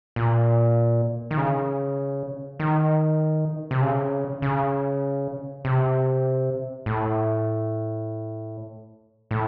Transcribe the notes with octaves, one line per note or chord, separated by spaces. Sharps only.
A#2
D#3
C#3
D#3
C3
C#3
C#3
C3
A2
A2